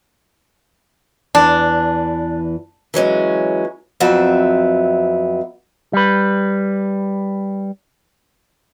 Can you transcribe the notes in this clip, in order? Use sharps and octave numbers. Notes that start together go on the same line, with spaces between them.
E2 E3 D4
E3 F#3 G#3 C#4
F2 F#3 B3 C4 E5
G3 B4